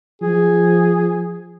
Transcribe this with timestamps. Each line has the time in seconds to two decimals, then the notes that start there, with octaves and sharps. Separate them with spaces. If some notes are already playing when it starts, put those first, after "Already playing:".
0.22 F3 G#4